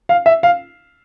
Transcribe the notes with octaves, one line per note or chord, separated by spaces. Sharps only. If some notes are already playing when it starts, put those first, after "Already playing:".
F5
E5
F5